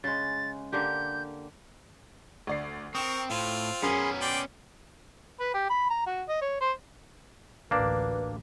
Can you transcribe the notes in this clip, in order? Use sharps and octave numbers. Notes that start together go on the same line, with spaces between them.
C#3 G#3 A6
D3 A#3 G4 G6
D2 D5 C7
C4 A#4 G5 C#6 D#6
A2 C4 F4
F#2 B3 C#4 G#4 A#4 B5 C6
D5 G5 C6 D6
B4
G4
B5
A#5
F#4
D#5
C#5
C5
A1 D2 A#3 D4 B4